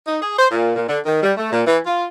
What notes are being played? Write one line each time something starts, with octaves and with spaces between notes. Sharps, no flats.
D#4
G#4
C5
A#2
A#2
D3
D#3
G3
A3
A#2
E3
F4